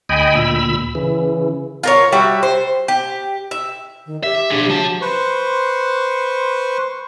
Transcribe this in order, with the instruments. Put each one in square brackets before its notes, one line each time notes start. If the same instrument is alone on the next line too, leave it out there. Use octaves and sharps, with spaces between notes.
[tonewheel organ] D2 D#5 G5 G#5 B5
D2 A#2 B5 E6
C#3 E3
[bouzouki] F4 A#4 C#5
G3 F#4 E5
C5
G4
E5
[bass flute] D#3
[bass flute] G4 [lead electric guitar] E5
[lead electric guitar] D4 G#4
[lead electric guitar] F3 A5 [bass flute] F#3
[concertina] B4 C5 C6 C#6